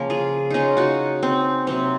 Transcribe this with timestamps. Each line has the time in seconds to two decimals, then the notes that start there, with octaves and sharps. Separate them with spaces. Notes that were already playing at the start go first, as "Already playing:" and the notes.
Already playing: C#3 F3 A#3 A#4
0.10 F4 G#4
0.50 C#4 D#4 F4
0.77 D#4 F#4
1.23 C4
1.67 C3 F#3 A#3 C4